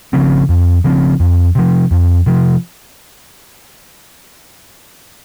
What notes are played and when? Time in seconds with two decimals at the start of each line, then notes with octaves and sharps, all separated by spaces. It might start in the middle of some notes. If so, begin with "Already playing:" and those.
0.13 C#3 F3 C4
0.49 F2
0.84 C#3 F3 C4
1.20 F2
1.55 C3 F3
1.91 F2
2.26 C3 F3